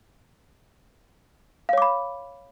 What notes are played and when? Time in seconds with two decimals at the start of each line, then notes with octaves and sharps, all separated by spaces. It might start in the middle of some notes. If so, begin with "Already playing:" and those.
1.69 F5
1.73 C#5
1.78 D6
1.82 B5